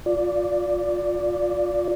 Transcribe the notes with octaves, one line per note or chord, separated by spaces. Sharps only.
F4 D5